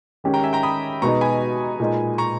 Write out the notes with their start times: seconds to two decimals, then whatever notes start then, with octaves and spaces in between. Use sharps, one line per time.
0.24 D#3 G#3 C#4 G4
0.34 G5 A#5
0.43 E5 G#5
0.53 G5 A#5
0.63 B5 D#6
1.02 B2 G#3 B3 D#4 A#5 C#6
1.21 G#5 B5
1.80 A#2 G#3 D#4
2.18 A#5 C#6